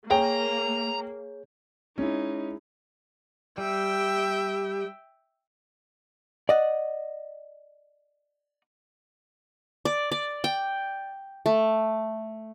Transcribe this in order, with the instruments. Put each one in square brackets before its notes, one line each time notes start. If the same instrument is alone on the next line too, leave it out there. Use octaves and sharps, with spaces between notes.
[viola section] A#3 [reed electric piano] G#4 C#5 [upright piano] G5 [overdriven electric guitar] A#5
[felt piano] G#3 E4 [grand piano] C#4 [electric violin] D#4
[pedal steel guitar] G3 [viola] E5 G5
[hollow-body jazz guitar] D5 D#5 F#5
[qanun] D5
D5
G5
A3